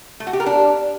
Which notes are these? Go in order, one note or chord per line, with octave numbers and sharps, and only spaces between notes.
A3
F#4
G4
A#4
D4